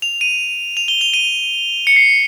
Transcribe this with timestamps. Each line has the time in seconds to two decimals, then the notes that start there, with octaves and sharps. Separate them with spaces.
0.02 F7
0.21 D#7
0.77 F7
0.88 G7
1.01 F7
1.14 D#7
1.87 C#7
1.96 C7